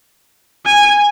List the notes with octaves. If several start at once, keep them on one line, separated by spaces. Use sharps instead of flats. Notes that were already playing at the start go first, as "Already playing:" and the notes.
G#5